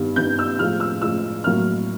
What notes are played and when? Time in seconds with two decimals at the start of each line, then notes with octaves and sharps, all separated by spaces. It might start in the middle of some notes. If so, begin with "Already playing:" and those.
Already playing: G2 D#3 G3 B3
0.16 G2 D#3 G3 B3 G6
0.39 E6
0.59 A2 F3 G#3 F6
0.80 E6
1.01 A2 F3 G#3 E6
1.44 A2 F#3 A#3 F6